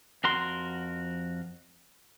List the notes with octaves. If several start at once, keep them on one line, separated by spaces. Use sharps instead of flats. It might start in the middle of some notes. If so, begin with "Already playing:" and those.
F2 F#4 A#4 C6